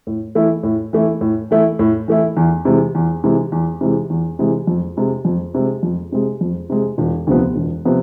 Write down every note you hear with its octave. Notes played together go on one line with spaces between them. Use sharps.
A2
E3 A3 E4
A2
E3 A3 E4
A2
E3 A3 E4
A2
E3 A3 E4
E2
C3 E3 G#3
E2
C3 E3 G#3
E2
C3 E3 G#3
E2
C3 E3 G#3
F2
C3 G#3
F2
C3 G#3
F2
C3 G#3
F2
C3 G#3
E1
D2 C3 F3 B3
E1
C3 F3 B3